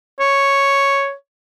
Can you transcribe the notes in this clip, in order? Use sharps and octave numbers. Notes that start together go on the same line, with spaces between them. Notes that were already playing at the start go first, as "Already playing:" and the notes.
C#5